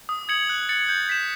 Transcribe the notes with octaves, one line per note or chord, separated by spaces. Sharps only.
D#6
G#6 C#7 F#7
F#6
A6 C#7 F#7
G6
B6 E7